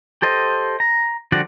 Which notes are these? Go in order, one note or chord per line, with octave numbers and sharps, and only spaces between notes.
G4 A4 C5 D#5
A#5
D3 F3 G3 F#4 D5